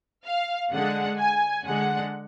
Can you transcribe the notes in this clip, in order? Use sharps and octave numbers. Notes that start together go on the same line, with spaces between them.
F5
D3 G#3 F#5
G#5
D3 G#3 F#5